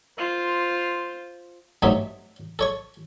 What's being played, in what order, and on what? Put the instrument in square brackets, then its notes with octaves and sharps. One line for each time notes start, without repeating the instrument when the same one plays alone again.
[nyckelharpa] F4 C5
[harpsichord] G2 F#3 A3 C4 D#4 E5
A4 C#5 C#6